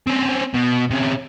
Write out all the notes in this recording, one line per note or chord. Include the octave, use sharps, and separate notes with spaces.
C4 C#4
B2
C3 C#4